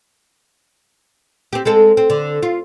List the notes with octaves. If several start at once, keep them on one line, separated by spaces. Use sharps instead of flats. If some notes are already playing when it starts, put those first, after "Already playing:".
C4 G4
G#3 C4 A4
C4
D3
F4